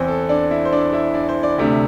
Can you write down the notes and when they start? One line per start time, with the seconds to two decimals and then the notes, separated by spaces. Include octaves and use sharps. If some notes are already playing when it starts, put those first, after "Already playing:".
Already playing: E2 E3 C4 C5
0.08 A4
0.29 D4 D5
0.51 E4 E5
0.65 C5
0.72 D4 D5
0.93 E4 E5
1.14 D4 D5
1.29 C5
1.43 D4 D5
1.58 D2 C3 A3 D4